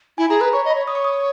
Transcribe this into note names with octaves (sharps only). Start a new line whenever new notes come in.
E4 G#5
G#4 A#5
B4 B5
C#5 C#6
D#5
B5
C#5
C#5 D#6
C#6
D#6